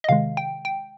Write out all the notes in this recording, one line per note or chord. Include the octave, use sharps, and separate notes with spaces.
D#5
C3 D#3 G#3 F5
G5
G5